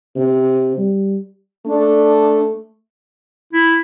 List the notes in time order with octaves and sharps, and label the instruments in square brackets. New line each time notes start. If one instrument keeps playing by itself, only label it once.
[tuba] C3
G3
[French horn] A3 [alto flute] D4
[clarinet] E4